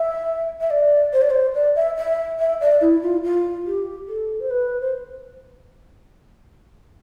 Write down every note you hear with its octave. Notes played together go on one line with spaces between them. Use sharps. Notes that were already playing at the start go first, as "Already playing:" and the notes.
Already playing: E5
E5
D5
C5
D5
C5
D5
E5
E5
E5
D5
E4
F4
F4
G4
A4
C5
B4
C5